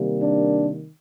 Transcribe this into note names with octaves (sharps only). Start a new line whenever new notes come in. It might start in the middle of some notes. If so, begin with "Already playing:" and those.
Already playing: C3 D#3 G3 A#3
D4